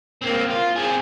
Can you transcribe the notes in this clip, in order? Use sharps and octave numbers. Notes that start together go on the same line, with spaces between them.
A#3 C4
F4
C4 G#4